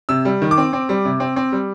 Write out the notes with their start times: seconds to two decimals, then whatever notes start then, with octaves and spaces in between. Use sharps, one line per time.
0.09 C3 E6
0.25 G3
0.42 D#3
0.51 D6
0.58 C4
0.73 C4
0.89 G3
1.05 C3
1.20 C4
1.36 C4
1.52 G3